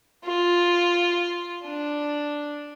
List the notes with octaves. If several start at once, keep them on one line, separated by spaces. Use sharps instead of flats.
F4
D4